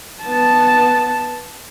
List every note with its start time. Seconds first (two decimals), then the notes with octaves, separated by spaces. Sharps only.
0.23 B3 A5